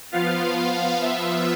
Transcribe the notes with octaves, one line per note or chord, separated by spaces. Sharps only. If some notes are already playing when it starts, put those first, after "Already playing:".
F3 B3 F4 F5
F5
E5